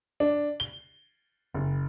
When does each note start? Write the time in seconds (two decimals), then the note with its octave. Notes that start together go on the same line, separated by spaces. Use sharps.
0.20 D4
0.60 G7
1.54 F#1